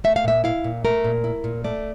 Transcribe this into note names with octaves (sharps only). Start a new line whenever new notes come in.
A3 E5
F5
A#2 E5
E4 F5
A#2
A3 A#4
A#2
E4
A#2
A3 D5